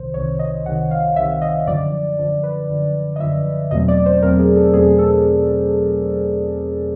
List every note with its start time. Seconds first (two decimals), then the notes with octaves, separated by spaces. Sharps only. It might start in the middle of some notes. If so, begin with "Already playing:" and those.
Already playing: C2 C3 D#3 C5
0.14 C2 C3 D#3 C#5
0.39 D#5
0.65 C2 C3 D#3 F#5
0.91 F5
1.16 C2 C3 D#3 E5
1.41 D#5
1.67 F#2 D3 F3 D5
2.18 F#2 D3 F3
2.43 B4
2.69 F#2 D3 F3
3.16 D#5
3.20 F#2 D3 F3 E5
3.71 E2 B2 F#3 A3 C4 D#5
3.88 D5
4.06 C5
4.22 E2 B2 F#3 A3 C4 A#4
4.39 G#4
4.56 A4
4.73 E2 B2 F#3 A3 C4 G#4
4.99 A4